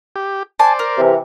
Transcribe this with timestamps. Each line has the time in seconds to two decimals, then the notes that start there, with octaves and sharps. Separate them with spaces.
0.16 G4
0.59 C5 D5 G#5 A5
0.79 A#4
0.98 C3 E3